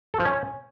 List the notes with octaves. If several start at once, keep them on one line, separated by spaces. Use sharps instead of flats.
A4
F3
C#4